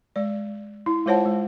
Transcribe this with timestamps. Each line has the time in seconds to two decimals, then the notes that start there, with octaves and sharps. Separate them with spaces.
0.16 G#3 D5
0.86 E4
1.06 G#3 F4 C5 C#5 F#5 A5
1.26 G#3